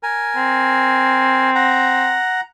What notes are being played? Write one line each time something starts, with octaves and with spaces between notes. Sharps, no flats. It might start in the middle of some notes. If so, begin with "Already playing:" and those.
A#4 G#5
C4
F#5 A#5